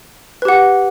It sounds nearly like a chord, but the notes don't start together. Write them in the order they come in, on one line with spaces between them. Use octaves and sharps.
B4 G4 F#5